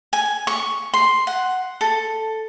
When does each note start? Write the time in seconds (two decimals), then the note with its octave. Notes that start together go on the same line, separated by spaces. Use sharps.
0.13 G#5
0.47 C#6
0.94 C6
1.27 F#5
1.81 A4